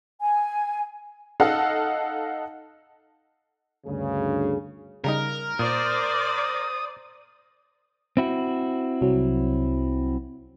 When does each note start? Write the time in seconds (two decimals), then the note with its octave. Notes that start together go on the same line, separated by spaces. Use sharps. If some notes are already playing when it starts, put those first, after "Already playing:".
0.21 G#5
1.40 D#4 A4 D#5 F5 F#5
3.86 D2 G2 C#3 G#4
5.04 C#3 G3 D#4 A#4
5.59 A#2 C5 D5 D#6
8.17 C4 E4 F#4
9.01 C2 F#3